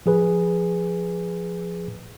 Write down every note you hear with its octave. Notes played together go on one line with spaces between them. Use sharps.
F3 G#4 B4